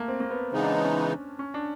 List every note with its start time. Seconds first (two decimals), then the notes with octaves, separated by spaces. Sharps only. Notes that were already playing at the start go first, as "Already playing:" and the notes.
Already playing: A3 A#3
0.08 C4
0.20 A#3
0.30 B3
0.52 C#3 E3 G#3 B3 C4 D#4
0.63 D4
0.74 D4
0.84 C#4
1.39 C#4
1.54 D4